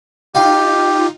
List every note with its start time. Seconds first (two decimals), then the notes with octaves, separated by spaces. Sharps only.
0.35 D#4 F4 G4 F5 G5